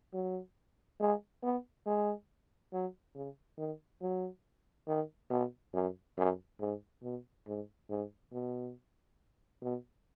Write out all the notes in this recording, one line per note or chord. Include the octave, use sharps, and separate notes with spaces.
F#3
G#3
B3
G#3
F#3
C#3
D#3
F#3
D#3
B2
F#2
F#2
G#2
B2
G#2
G#2
B2
B2